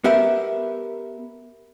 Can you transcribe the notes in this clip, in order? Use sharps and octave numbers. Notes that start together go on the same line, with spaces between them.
B3 G4 A#4 E5